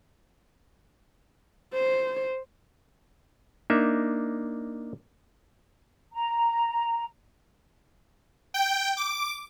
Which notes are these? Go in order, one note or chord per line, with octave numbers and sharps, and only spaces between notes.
C5
A#3 D4 D#4 E5
A#5
G5
D6